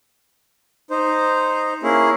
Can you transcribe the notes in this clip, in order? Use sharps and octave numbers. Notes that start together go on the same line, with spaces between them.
D#4 C5
A#3 C#4 E4 G#4